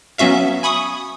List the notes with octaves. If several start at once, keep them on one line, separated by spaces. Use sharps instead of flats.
F#3 B3 C#4 F#4 E5 F5
G#5 B5 C#6 D#6